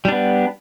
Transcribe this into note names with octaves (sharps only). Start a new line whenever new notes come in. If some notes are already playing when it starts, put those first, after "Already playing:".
G3 B3 D4